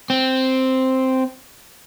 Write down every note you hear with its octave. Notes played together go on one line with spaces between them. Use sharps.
C4